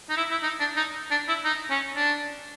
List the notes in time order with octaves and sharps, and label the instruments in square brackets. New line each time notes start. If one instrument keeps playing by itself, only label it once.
[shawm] D#4
E4
E4
D#4
D4
D#4
D4
E4
D#4
C#4
D4